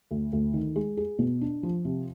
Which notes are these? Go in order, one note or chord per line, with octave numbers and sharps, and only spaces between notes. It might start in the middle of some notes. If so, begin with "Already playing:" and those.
D2
D2
D#3
G#3
G#4
B2
D4
F3
C3